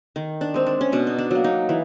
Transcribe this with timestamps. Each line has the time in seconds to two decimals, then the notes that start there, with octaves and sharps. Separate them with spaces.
0.16 D#3
0.41 D4
0.54 G#3 C4
0.67 D4
0.81 C#4
0.92 B2 D4
1.07 D#4
1.18 D4
1.31 F#3 A#3
1.44 D#4
1.69 E3